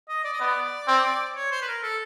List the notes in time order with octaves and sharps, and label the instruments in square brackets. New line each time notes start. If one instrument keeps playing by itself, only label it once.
[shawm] D#5
D5
D#5
[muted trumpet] B3 [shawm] D5
[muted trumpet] C4
[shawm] C#5
C5
B4
A#4
A4